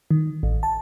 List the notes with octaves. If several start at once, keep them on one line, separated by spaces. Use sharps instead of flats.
D#3
A1
A5